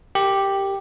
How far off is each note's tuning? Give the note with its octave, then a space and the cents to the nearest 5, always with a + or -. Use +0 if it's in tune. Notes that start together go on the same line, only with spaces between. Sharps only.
G4 +0 A#4 -25